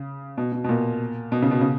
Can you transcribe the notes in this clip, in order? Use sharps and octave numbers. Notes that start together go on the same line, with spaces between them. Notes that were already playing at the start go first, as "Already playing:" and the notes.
Already playing: C#3
B2
B2
B2
A#2
B2
C#3
B2
C#3